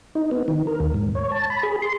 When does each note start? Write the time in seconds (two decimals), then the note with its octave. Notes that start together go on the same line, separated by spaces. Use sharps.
0.15 D#4
0.31 B3
0.48 D#3
0.67 A#4
0.80 D#2
0.94 G#2
1.15 C#5
1.32 A5
1.50 B5
1.63 G#4
1.82 C6